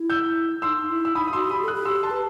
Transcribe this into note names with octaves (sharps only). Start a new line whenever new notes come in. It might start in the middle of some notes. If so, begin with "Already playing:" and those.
Already playing: E4
E6 G6
D#4 C6 E6
D#4
E4
E6
D#4 B5 D#6
D#6
F#4 C6 E6
G4 B5 D#6
A4
D#6 F#6
G4
C6 E6
A5 C6
B4